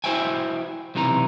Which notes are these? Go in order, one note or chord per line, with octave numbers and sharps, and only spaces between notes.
E4 F#4 C5 E5 G5 G#5
B1 C3 E3 D#4 A#5